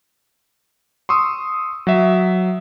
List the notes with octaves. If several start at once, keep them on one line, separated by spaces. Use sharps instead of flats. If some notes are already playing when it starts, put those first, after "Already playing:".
C6 C#6 D#6 E6
F#3 E5